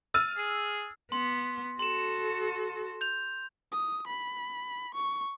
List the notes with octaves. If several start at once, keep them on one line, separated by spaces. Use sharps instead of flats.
E6 F6 A6 D#7
G#4
B3 C6
F#4 A4 C6 E7
G6 F7
D#6
B5
C#6